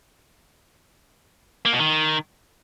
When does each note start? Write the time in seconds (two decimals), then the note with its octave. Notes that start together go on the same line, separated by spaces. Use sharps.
1.65 A#3
1.73 B2
1.80 D#3